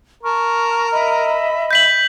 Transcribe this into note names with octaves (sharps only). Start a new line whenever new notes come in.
A#4 A5 C#6 F6
D#5 E5 B5
G6 B6 F#7